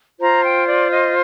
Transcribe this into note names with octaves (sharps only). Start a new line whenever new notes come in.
F4 C5 A#5
G5
D5
D#5